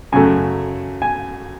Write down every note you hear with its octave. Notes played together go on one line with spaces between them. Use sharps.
F#2 C#3 F#3 A3 G#5
G#5